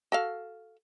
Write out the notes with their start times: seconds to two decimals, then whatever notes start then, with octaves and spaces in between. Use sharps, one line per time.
0.12 F#4 A4 F5